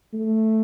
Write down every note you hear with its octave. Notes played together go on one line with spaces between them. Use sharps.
A3